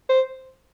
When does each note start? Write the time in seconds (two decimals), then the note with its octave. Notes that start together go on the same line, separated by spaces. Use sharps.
0.09 C5